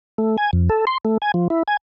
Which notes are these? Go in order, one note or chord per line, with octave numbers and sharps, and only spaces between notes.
A3
G#5
F2
A4
C6
A3
G#5
F3
E4
G#5